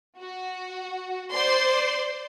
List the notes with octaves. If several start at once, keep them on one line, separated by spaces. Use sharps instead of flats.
F#4
C5 D5 C6